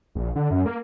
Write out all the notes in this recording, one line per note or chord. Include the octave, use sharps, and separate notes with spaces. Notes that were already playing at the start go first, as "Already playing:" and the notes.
A#1
D3
F#2
A#3